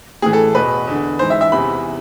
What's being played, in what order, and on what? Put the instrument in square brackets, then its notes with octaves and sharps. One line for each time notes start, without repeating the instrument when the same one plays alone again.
[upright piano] A2 E3 G#4
A4
E2 B2 B4
E2 D3
G#2 E3 C5
E5
E5
E2 C3 E3 B5